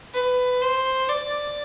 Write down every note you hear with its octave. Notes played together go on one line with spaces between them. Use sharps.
B4
C5
D5